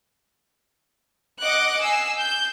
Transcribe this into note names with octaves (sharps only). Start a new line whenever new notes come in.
D#5 F#5 D6 F#6 C#7
G#5 E6 C7
G6